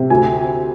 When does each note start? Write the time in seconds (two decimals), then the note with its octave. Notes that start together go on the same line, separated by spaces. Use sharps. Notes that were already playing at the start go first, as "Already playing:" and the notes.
Already playing: C3
0.10 D2 G#5